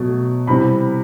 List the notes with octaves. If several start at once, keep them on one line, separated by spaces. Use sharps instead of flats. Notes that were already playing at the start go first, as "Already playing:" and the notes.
Already playing: B2 F#3 A3
C3 E3 G3 B5